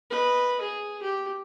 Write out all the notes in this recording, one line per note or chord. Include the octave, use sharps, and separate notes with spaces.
B4 D#5
G#4
G4